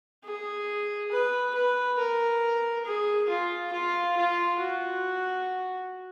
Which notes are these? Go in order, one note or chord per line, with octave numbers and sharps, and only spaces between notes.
G#4
B4
B4
A#4
G#4
F4
F4
F4
F#4